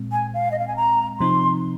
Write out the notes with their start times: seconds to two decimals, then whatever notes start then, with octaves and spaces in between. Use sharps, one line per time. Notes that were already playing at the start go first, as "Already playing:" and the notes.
Already playing: A#2 G#3 C4
0.12 G#5
0.34 F5
0.52 D#5
0.59 F5
0.68 G#5
0.76 A#5
1.20 C3 F3 C4 D#4 C6